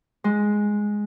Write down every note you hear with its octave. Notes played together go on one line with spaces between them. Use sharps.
G#3